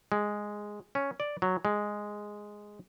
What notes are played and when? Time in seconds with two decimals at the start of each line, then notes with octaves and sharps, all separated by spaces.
0.12 G#3
0.95 C#4
1.20 D5
1.42 F#3
1.65 G#3